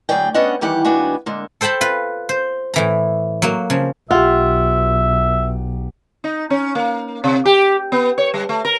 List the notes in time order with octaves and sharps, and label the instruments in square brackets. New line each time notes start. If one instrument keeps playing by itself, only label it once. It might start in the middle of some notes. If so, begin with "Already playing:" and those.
[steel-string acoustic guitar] D2 G#2 F#3 G#4 D5 G5
B3 C#4 D4 D#5 F#5
D#3 E3 G3 G4 F#5
D#2 G3 B3 D4 F#4 G#5
D3 G#3 A#3
[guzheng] A4 C5 G5 A5 B5
F4 B4
C5
A2 E3 A#5
F#3 A#3
C#3 F3
[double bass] B1 [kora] F4 [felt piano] G4 F#5 [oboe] E5
[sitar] D#4
C#4
A#3
C3
G4
B3
C#5
G3
A3
A#4